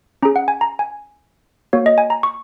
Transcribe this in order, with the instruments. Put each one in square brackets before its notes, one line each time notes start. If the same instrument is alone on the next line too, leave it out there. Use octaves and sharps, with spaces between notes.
[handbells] C#4 G#4 A#5
F#5
G#5
A#5
G#5
A#3 F#4 C#5
D#5
G#5
A#5
C#6